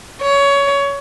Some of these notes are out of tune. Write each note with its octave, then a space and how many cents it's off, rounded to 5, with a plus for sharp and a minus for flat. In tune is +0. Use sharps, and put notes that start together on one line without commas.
C#5 +20